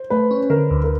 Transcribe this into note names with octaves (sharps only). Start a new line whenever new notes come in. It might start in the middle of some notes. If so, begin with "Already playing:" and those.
Already playing: C5
A3 B4
C#4
D3 A#4
D2
A#4